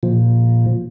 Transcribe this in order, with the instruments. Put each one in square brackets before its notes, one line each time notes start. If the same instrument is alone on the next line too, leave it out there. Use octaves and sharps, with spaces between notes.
[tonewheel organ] A#2 F3